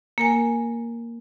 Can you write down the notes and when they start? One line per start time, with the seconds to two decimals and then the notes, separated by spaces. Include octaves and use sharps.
0.18 A#3 A#4 G#5